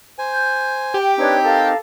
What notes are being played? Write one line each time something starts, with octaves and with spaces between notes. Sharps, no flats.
C5 G#5
G6
G4 G5
C4 D4 D#4 B4 C#5
A4 A#4 F5